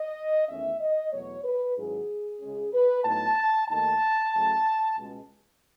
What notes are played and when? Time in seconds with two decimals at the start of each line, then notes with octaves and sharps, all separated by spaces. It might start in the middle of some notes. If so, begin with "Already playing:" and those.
Already playing: D#5
0.48 E2 D#3 A3 C#4 E5
0.80 D#5
1.12 E2 B2 F#3 A3 C#5
1.44 B4
1.77 G#2 D#3 F#3 C#4 E4 G#4
2.40 C#2 C#3 G#3 C#4
2.73 B4
3.04 A2 F#3 B3 D#4 A5
3.68 D#2 D#3 A3 D#4 A5
4.33 C#3 F#3 A3
4.96 C#2 B2 G#3